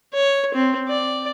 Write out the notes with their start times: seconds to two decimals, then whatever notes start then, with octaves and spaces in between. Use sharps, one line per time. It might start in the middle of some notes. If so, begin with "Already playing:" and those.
0.14 C#5
0.54 C4
0.88 D5